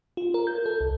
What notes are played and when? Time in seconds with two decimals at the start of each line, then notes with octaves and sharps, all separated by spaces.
0.17 F4
0.34 A#4
0.47 G6
0.66 A4
0.81 C2